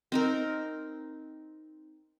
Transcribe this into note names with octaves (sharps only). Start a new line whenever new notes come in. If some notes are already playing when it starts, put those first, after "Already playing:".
C4 D#4 A#4